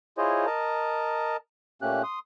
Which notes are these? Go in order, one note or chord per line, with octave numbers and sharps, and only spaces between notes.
E4 F4 G#4 C5 C#5 D#5
A#4 D#5 A5 A#5
A#2 A3 A#3 C#4 G4 F#6
C6 D#6